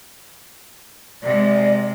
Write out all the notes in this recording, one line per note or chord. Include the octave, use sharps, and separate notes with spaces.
C3 G#3 D5